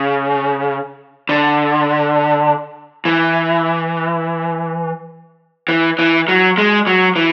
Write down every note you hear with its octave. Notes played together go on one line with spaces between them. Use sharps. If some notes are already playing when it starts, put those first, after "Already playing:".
Already playing: C#3
D3
E3
E3
E3
F#3
G#3
F#3
E3